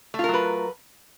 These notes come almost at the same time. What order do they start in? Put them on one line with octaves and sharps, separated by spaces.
A3 F4 A#4 F#3 B4